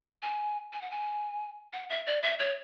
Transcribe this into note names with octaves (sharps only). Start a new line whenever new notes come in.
G#5
G#5
F#5
G#5
F#5
E5
D5
E5
C#5